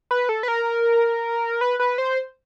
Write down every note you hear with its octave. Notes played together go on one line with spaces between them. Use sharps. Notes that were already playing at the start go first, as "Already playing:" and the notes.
B4
A4
B4
A#4
B4
B4
C5